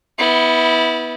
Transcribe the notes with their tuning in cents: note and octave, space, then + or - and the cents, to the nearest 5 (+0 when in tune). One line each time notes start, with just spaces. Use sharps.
B3 +0 E4 -25